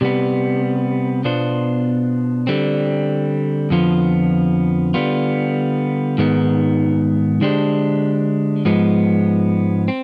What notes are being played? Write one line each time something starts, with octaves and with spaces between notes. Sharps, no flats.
C3 G3 B3
B2 B3 D4 F4 C5
D3 G3 C4
F2 D3 F3 B3 F4
D3 G3 B3 F4
G#2 D#3 G#3 B3
D3 G#3 D4 G4 C5
G#2 F3 G#3 B3
C4